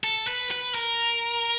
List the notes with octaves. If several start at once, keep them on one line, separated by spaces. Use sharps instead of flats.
A4
B4
B4
A#4